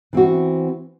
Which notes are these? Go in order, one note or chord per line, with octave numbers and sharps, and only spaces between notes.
E3 C4 F#4